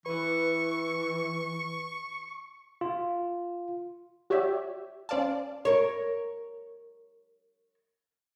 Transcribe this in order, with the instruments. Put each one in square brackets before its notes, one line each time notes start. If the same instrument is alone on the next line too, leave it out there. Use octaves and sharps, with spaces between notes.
[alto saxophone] E3 [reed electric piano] B4 [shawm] C#6
[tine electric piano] F4
[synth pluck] F#4 G4 C#5 D5 E5
C#4 C5 D5 F5 A5
[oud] A#4 C#5